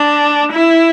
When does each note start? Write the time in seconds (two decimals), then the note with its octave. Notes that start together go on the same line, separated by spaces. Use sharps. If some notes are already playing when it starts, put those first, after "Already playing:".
Already playing: D4
0.52 E4